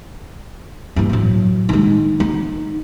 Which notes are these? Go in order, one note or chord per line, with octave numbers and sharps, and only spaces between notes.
G2 E3
A2 F#3
D#3 G#3
D#4